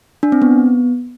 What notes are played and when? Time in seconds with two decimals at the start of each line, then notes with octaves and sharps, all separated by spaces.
0.23 D4
0.32 C4
0.42 B3